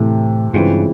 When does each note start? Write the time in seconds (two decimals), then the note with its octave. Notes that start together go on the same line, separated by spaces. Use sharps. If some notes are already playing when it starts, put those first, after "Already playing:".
Already playing: A2 C3 E3 A3
0.54 G2 C#3 E3 G#3 C4 F4